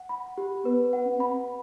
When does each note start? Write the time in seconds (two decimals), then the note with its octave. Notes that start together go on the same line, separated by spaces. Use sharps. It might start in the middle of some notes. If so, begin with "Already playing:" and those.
Already playing: F#5
0.09 B5
0.38 G4
0.65 B3 B4
0.93 F#5
1.06 C4
1.20 B5